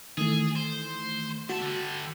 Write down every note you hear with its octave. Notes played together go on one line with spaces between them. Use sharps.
D#3 E3 A3 G#4
C5
A3 F#4 A5
D3 G3